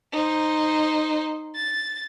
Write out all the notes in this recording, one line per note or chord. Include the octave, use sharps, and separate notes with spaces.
D#4 C5
A6